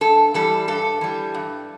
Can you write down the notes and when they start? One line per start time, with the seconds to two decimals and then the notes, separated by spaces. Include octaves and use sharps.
0.01 G2 A4
0.34 E3 G3 A4
0.68 G2 A4
1.01 E3 G3
1.34 G2